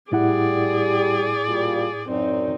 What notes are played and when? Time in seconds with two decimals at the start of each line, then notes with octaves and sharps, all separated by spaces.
0.12 A2 G3 E4 G4 G#4 D5 F#5
1.48 A#2 G3 F4
2.09 F#2 C4 D#4 D5